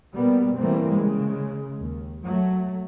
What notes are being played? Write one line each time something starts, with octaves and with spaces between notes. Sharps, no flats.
B2 G3 A#3 B3
B2 E3 G3 A3 A#3 C4
C#3 G#3
D#2
F#3 A3